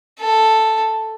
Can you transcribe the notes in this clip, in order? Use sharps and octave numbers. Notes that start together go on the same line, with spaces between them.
A4